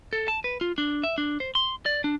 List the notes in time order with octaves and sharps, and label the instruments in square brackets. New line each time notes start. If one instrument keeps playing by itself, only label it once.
[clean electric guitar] A4
A5
B4
F4
D4
E5
D4
C5
C6
D5
D4